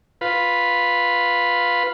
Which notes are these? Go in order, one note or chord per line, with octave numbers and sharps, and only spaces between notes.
F4 B4